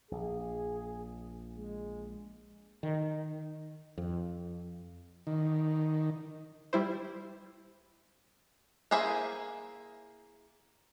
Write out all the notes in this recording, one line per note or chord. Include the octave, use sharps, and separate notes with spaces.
A#1 G#4
G#3
D#3
F2
D#3
G3 E4 C5
A#3 E4 G#4 C5 E5